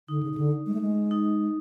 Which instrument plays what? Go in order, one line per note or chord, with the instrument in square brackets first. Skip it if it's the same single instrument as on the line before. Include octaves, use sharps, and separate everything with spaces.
[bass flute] D3 [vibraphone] D#4
[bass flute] C#3
C#3
D3
G#3
A3
G#3
[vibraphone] D#4